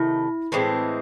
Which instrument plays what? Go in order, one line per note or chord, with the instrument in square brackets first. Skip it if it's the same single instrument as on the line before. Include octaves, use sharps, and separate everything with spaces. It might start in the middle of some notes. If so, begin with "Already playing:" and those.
Already playing: [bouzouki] C3 D#3 A3 [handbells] E4
[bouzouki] A2 E3 G#3 C4